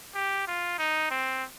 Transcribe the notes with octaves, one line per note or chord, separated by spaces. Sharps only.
G4
F4
D#4
C4